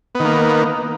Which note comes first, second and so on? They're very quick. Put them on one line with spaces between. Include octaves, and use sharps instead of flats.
B3 D#3 A#3